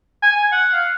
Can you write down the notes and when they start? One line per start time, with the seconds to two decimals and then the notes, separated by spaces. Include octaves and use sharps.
0.22 G#5
0.52 F#5
0.72 F5